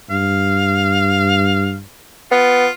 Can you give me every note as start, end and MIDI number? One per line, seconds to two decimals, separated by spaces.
0.10 1.81 43
0.10 1.74 77
2.32 2.67 59
2.32 2.72 65